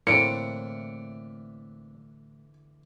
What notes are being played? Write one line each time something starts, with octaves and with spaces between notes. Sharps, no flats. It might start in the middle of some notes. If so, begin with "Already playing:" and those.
A2 D3 E3 A#3 C4 E4 C#7 D7